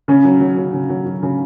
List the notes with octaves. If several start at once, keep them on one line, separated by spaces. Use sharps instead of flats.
C#3 C#4
F#3
F#3
C#3
C#3
F#3
F#3
C#3